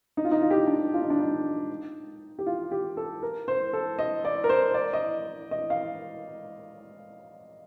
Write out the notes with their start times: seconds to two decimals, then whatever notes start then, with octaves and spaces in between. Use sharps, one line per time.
0.17 D#4
0.25 F4
0.31 D#4
0.42 F4
0.51 G4
0.58 F4
0.67 D4
0.94 F4
1.02 D#4
1.10 D4
1.19 D#4
2.39 G4
2.47 F4
2.71 G4
2.97 A4
3.23 A#4
3.48 C5
3.73 A4
3.99 D#5
4.25 D5
4.44 A#4
4.49 C5
4.74 D5
4.93 D#5
5.51 D#5
5.70 F5